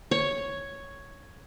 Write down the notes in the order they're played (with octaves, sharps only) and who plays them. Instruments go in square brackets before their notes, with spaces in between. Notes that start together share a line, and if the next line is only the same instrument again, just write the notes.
[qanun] C#5